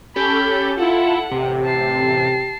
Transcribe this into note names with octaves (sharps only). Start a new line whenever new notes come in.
C#4 G4 A4 B5 G6
E4 F4 A4 F#5
A1 C3 G4
A5 C7